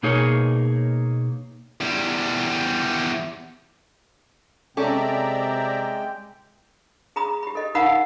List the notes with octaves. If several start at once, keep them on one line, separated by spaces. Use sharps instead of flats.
B2 A#3 D#4 G#4 A#4 C#5
E2 G3
C3 G#3 C#4 A4 D5 E5 G5 A#5
G#4 A#5 B5 D#6
G4 B5
A4 D#5
D#4 A#4 F5 F#5 B5 D#6